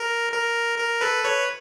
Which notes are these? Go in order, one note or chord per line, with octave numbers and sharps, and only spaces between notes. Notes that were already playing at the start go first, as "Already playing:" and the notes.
Already playing: A#4
A#4
A#4
A4 B4
B4 C#5